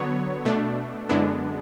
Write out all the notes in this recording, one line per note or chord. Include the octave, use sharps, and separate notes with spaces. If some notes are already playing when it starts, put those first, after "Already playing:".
Already playing: D3 F#3 B3 C#5
B2 A3 D4
F#2 D3 G#3 B3 D4 E4